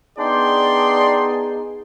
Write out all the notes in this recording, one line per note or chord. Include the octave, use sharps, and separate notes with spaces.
B3 D4 D#4 G#4 D5 G5 C6